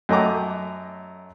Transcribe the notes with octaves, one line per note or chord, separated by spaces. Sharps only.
F#2 A3 D#5 G5 A#5 D6